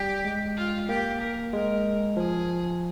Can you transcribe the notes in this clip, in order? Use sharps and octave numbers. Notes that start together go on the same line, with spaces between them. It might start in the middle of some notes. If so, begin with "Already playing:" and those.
Already playing: G3 G4
G#3
F4
A#3 G4
A#4
G#3 A#4
F3 G#4